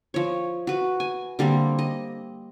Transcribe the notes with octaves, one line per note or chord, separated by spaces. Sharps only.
F3 C#5
F#4 B4
G#5
D3 G3 A#3 C4
D#5